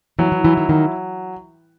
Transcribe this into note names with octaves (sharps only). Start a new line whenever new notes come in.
E3 F#3
E3
E3 E4
D#3
D#3 F#3